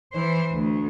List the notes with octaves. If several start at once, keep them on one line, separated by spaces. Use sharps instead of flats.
E3 C5
D2